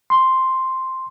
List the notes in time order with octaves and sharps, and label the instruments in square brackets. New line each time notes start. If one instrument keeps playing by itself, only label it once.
[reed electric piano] C6